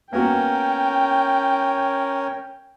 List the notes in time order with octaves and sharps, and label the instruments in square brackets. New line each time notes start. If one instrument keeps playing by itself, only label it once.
[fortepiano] A#3 B3 F#4 [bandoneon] C#4 A#4 C#5 [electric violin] G5